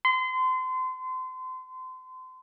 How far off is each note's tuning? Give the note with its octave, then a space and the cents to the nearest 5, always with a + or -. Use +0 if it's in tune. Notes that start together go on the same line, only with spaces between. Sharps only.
C6 -30